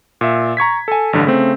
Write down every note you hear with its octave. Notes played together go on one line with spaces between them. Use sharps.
A#2 E5
A#5 C#6 G#6 B6
A4 G#5
A1 G2 D3
C#3 A3 C4